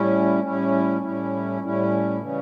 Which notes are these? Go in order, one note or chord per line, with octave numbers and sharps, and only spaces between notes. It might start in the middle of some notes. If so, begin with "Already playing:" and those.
Already playing: A2 G3 C#4 E4
A2 G3 C#4 E4
A2 G3 C#4 E4
A2 G3 C#4 E4
C#3 E3 G3 C#4